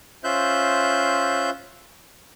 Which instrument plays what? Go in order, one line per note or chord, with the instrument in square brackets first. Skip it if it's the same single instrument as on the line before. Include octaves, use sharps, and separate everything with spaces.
[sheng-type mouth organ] C#4 F4 C5 E5 F#6 G6